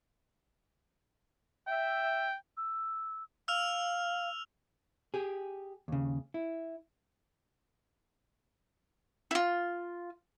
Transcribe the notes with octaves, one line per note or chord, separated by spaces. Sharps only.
E5 G5
E6
F5 E6 F6 F7
G4 G#4
D#2 C#3
E4
E4 F4